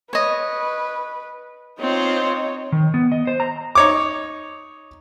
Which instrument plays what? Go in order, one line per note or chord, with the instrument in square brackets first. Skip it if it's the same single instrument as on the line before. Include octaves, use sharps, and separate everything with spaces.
[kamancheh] B4 [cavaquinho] C#5 D#5
[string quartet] C4 F4 C5 [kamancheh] D#4 C#5
[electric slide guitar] D#3
B3
D#5
C5
A#5
[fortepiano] D#4 C#5 D6